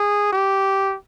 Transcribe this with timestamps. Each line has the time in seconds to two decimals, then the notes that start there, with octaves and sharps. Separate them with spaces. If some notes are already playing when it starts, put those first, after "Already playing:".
Already playing: G#4
0.33 G4